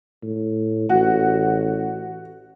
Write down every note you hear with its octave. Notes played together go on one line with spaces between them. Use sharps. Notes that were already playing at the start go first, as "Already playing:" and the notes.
A2
A1 F#4